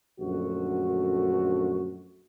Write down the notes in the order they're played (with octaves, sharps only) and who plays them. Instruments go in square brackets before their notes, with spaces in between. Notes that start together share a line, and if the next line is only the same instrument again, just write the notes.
[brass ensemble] A#1 F#2 D3 A3 F#4